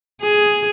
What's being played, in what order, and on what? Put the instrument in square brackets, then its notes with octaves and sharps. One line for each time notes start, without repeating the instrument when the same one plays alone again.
[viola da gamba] G#4